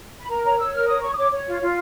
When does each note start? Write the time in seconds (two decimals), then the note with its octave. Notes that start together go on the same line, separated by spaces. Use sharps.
0.19 B5
0.30 A#4 A#5
0.44 C#5 A#5
0.59 C#5 E6
0.74 A#4 F6
0.88 C#5 D#6
1.02 C#5 C#6
1.13 D#6
1.16 C#5 D6
1.32 C#5
1.47 F4
1.61 F4